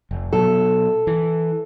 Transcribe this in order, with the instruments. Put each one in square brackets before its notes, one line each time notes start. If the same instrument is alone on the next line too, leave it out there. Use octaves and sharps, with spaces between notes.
[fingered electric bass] F1
[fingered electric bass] B2 F#3 [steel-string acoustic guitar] A4
[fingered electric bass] E3